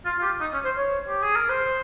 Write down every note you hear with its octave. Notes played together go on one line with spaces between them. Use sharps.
F4
F4
G4
D#4
C#4
C5
C#5
G4
G#4
A#4
C5